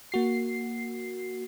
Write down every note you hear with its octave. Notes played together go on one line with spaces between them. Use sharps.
A#3 F#4 C7